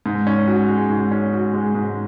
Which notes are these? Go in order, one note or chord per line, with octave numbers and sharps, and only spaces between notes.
G#2
C#4
F#4
G#3
G#2
C#4
F#4
G#3
G#2